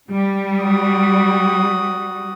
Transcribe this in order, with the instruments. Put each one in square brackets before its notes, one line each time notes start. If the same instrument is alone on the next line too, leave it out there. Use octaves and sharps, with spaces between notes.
[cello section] G3
[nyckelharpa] F#4 D#6